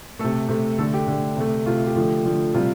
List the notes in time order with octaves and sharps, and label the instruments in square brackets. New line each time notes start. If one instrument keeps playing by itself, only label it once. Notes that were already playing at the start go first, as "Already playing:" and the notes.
[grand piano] C3 A3 A4
C3 A3
D3 A3 A4
G4
D3
A3
C3 A3
C3 A3 F4
G4
D3 F3 A3
D3 F3 A3
C3 G3 F4